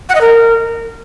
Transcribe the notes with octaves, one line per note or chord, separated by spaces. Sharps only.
F#5
D#5
A#4